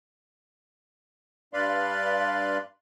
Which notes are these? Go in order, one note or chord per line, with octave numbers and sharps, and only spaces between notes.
G2 B4 D5 F5 B5 C6